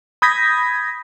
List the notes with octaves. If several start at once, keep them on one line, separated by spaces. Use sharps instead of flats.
B5 D#6 G6 G#6 A#6 B6